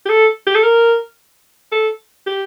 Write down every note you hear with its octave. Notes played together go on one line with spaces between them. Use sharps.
G4
A4
G4
A4
A#4
A4
G4